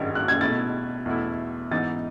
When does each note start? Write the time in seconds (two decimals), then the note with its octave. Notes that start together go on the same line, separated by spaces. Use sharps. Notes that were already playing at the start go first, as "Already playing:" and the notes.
Already playing: G#1 G#2 D#3 G#6 A6 B6
0.15 F#6
0.28 G#6
0.41 B2 A3 E4 A6
1.06 E2 B2 A3 E4
1.71 G#2 E3 B3 D#4 A6